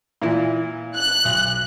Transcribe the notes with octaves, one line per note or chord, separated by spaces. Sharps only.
A#2 E3 E4
F#6
B1